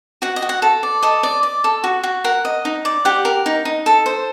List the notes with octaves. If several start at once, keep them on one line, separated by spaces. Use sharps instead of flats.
F#4 F#5
D#5
F#4
F#5
A4
D5
A4 D#5
D5
D5
A4
F#4
F#4
A#4 F#5
D#5
D#4
D5
G4 F#5
A#4
D#4
D#4
A4
C5